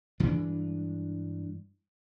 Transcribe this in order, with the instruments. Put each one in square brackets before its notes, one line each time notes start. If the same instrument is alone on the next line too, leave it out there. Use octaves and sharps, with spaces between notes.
[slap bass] G2 E3 G#3 D4